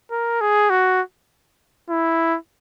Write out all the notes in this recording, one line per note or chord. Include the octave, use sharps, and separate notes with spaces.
A#4
G#4
F#4
E4